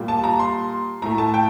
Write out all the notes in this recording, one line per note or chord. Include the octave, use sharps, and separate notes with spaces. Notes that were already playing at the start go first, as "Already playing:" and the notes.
Already playing: A#2 G3 A#3
A5
A#5
C6
A2 A3 A#5
A5
G5